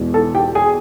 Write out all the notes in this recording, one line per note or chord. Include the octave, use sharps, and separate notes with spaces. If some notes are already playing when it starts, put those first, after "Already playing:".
Already playing: E2 B2 G#3
A4 A5
G4 G5
G#4 G#5